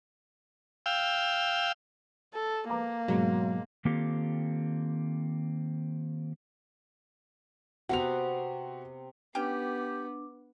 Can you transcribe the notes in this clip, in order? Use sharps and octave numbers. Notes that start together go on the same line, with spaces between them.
F5 G5 E6
A4
A#3 B4 A#5 D6
G#2 B2 F#3
D#3 A#3 C4 F4 G4 A4
C3 B3 C4 F#4 F7
B3 C#4 D4 G4 G5 D6